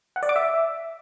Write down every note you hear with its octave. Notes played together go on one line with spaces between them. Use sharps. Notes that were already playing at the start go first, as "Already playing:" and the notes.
F#5
D5
D6
E5